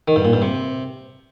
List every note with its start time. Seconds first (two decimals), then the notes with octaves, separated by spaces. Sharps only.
0.08 D#3
0.16 G2
0.25 A#2
0.33 G2
0.42 C3